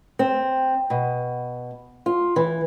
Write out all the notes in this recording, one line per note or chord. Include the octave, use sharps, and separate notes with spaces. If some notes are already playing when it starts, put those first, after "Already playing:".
C4
B2
F4
E3